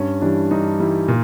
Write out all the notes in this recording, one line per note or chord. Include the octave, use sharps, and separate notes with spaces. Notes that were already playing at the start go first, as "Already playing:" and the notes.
Already playing: G2 C#4
E3 G3 D4
G2 D#4
E3 G3
A#2